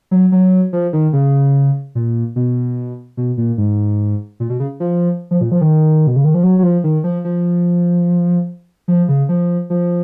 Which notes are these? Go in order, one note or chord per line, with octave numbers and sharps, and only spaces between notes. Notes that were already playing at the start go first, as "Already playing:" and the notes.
F#3
F#3
F3
D#3
C#3
A#2
B2
B2
A#2
G#2
A#2
B2
C#3
F3
F3
A#2
F3
D#3
B2
C#3
D#3
F3
F#3
F#3
F3
D#3
F3
F3
F3
C#3
F3
F3